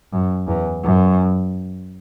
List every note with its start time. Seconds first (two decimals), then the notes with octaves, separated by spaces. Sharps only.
0.12 F#2
0.48 E2
0.83 F#2